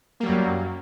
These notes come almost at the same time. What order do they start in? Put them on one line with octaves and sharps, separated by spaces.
A#3 G3 F#3 F#2